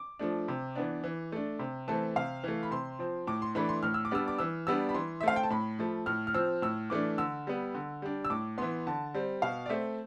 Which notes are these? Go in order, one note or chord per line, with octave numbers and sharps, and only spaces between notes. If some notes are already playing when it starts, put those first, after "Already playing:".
Already playing: D6
F3 A3 D4
C3
E3 B3 D4
E3
A3 D4
C3
E3 A3 C4 A5
C3 F5
E3 A3
B5
C3 C6
F3 C4
A2 D6
C6
E3 A3 D4 B5
C6
A2 F6
E6
D6
G3 B3 D4 E6
D6
E3 E6
G3 B3 D4 E6
B5
E3 C6
E5
A3 C4 F5
G5
A5
A2 B5
F3 A3
A2 F6
F6
F3 C4 E6
A2 E6
E3 A3 D4 D6
D3 E6
G3 B3
D3
G3 D4
E6
A2 D6
E3 B3 C6
D3 A5
G3 C4
B2 F5
D5
A3 C4 E5